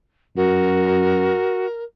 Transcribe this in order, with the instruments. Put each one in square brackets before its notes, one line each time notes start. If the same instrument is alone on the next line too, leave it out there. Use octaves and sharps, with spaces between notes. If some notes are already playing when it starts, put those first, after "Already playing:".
[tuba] F#2 [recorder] F#4 [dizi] A#4